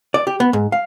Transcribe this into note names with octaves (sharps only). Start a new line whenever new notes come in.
D5
G4
B3
G#2
F5